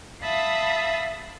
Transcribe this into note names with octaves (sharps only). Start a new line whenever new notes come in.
E5 F5 A5 B5 D#6 E6